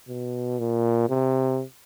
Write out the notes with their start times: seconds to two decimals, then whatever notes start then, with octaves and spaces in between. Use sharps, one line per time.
0.08 B2
0.59 A#2
1.09 C3